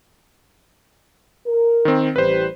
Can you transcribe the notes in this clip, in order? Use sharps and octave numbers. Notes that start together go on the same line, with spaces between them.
A#4
D#3 C4
A1 G3 B4 C5